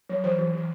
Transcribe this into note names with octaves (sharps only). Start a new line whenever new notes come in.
F#3
E3 C5
E3
E3